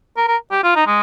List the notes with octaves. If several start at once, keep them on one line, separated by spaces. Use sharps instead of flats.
A#4
A#4
G4
F4
D#4
G#3